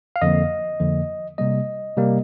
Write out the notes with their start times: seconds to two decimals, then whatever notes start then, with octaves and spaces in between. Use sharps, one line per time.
0.16 F5
0.22 F2 D3 F3 A#3 D#5
0.80 F2 D3 F3 A#3
1.38 C3 G3 A#3 D#5
1.97 C3 G3 A#3